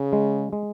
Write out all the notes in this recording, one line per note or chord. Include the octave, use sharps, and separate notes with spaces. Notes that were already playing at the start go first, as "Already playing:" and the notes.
Already playing: C#3 G#4
G#3
G#3